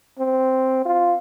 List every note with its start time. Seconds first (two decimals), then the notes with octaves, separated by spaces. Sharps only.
0.19 C4
0.85 F4